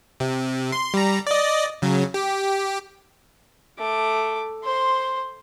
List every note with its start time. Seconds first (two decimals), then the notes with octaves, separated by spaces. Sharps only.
0.20 C3
0.72 C6
0.94 G3 A#5
1.27 D5 D#5
1.82 C#3 F#3
2.14 G4
3.78 A3 D6
4.64 C5 C6